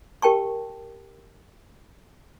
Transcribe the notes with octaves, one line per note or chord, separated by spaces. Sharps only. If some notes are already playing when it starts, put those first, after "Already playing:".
G4 A#4 G5 A5 C#6